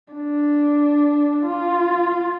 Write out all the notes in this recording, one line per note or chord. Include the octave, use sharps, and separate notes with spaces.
D4
F4